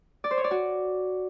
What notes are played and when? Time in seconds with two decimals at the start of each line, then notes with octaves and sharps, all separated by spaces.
0.24 D5
0.31 C5
0.37 C#5
0.44 D5
0.51 F#4